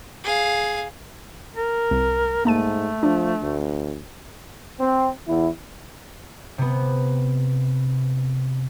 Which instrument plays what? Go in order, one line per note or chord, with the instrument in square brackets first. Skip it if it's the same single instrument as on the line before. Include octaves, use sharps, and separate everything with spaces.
[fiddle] G#4 F5
[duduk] A#4
[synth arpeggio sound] C2
[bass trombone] G#2 [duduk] A3 [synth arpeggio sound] A#3 A5 D#7
[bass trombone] F3 [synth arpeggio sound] D4
[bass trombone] D2
[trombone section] C4
E2 E4
[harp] C3 B3